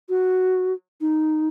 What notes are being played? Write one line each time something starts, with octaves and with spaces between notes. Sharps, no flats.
F#4
D#4